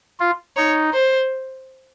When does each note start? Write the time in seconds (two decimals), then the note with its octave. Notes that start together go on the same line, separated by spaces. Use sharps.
0.20 F4
0.57 D#4 C#5
0.93 C5